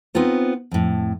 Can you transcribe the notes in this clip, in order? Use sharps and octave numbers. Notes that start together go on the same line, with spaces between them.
B3 C4 D#4 F4 C5
F2 A2